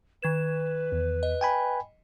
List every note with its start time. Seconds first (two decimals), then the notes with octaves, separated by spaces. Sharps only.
0.23 D#3 B4 G#6 E7
0.92 E2
1.23 D#5
1.41 G5 G#5 B5